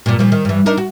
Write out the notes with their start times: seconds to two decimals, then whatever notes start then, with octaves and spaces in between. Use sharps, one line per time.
0.06 G2 A#2
0.19 A#2 F3
0.32 D#3
0.45 G2 E3
0.66 D4 D#4 A#4
0.77 F#4